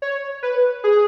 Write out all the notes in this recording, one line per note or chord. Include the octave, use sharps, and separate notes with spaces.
C#5
B4
G#4